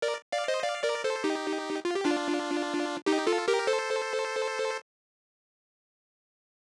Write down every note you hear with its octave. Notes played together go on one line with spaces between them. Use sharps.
A#4 D5
D5 F5
C5 D#5
D5 F5
A#4 D5
A4 C5
D#4 G4
F4
G4
D4 F4
D#4 G4
F4 A4
G4 A#4
A4 C5